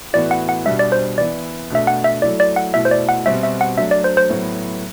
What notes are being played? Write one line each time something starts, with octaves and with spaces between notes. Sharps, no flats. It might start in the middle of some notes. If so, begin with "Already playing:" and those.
A2 E3 B3 F#4 D5
F#5
F#5
B2 G3 D4 E5
D5
C5
E3 B3 E4 D5
B2 A3 D4 E5
F#5
E5
F#3 A3 E4 D5
D5
F#5
B2 A3 E4 E5
C5
D5
F#5
B2 G3 C4 F#4 E5
E5
F#5
F#3 A3 D4 E5
D5
C5
C5
A2 F#3 B3 F#4